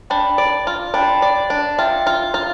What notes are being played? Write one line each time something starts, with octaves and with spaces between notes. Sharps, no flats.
D4 G5 B5
D5
F4
D4 G5 B5
D5
D4
F4 E5 G5
F4
F4